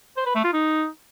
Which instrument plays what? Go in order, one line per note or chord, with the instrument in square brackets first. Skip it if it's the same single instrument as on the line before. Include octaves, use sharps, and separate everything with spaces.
[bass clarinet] C5
B4
A3
F4
D#4